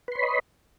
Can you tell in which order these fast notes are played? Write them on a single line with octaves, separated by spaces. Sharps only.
B4 C6 C#5 B5 D#5